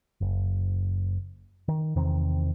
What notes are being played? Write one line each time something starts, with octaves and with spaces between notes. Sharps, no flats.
F#1
D#3
E2 C3 D#3 C4